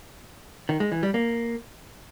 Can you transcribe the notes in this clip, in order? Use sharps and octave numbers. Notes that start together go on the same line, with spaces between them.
D#3
G#3
E3
G3
A#3